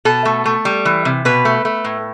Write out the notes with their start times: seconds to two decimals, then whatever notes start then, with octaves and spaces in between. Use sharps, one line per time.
0.05 B2 A4
0.25 A3
0.45 A3
0.65 G3
0.85 E3
1.05 C3
1.25 B2 B4
1.45 A3
1.65 A3
1.84 A2